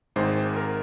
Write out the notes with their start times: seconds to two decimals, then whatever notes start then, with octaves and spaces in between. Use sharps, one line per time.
0.16 G#1 G#2 D#3 G#3 C5
0.56 A#4